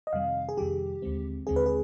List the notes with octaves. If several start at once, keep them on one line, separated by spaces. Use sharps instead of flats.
D#5
F2 C3 D#3 G3 F5
G#4
F2 C3 D#3 G3 G4
D#2 D3 G#3 C4
D#2 D3 G#3 C4 G#4
B4
G#4